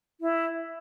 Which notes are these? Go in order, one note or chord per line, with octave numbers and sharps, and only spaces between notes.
E4